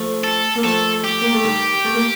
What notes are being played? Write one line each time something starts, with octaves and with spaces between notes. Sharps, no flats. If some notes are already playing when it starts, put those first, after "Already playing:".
Already playing: F3 A3
A4
A#3
F3 A3 A4
G4
A#3
A3
D#3 G3
A3
A#3